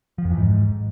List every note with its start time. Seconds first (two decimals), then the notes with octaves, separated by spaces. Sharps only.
0.18 F3
0.25 F2
0.31 E3
0.37 G#2